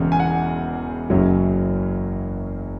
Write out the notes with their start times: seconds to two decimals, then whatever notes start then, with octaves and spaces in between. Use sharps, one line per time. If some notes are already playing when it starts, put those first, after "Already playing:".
Already playing: E1 E2 C#3
0.12 G#5
0.20 F#5
1.10 F#1 F#2 C#3 F#3 C#4